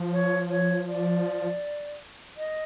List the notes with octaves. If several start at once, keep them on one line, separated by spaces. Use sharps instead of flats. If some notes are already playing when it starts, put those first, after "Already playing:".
Already playing: F3
C#5
C#5
D5
D#5